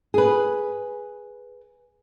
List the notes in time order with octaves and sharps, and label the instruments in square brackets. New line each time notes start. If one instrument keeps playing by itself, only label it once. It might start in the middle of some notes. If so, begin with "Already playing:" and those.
[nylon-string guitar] G#4 B4